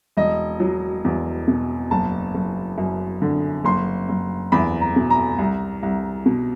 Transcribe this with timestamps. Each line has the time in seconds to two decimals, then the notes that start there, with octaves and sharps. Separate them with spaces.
0.17 E1 D#5
0.60 F#3
1.05 E2
1.48 B2
1.91 F#1 A5
2.35 F#1
2.78 F#2
3.22 D3
3.64 F#1 C6
4.09 F#1
4.52 E2 B5
4.81 A#5
4.96 B2
5.10 A#5
5.38 C2
5.83 C2
6.26 B2